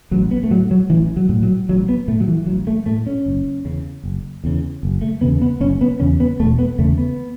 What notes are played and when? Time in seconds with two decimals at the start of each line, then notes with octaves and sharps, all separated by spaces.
0.11 A1 F#3
0.31 B3
0.43 A3
0.50 A2 F#3
0.71 F#3
0.90 A1 E3
1.16 F#3
1.29 A2
1.43 F#3
1.69 A1 F#3
1.89 B3
2.08 A2 A3
2.20 F#3
2.28 E3
2.46 A1 F#3
2.67 A3
2.86 A2 A3
3.06 C#4
3.26 F#1
3.65 E2 C#3
4.03 F#1
4.44 E2 C#3
4.83 F#1
5.02 A3
5.21 E2 C#3 B3
5.41 B3
5.60 F#1 C#4
5.81 B3
6.00 E2 C#3 C#4
6.20 B3
6.40 E1 A3
6.59 B3
6.78 E2 C#3 A3
6.98 B3